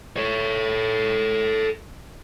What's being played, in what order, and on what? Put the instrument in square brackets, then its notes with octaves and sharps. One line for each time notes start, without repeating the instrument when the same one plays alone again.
[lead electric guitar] A4 C#5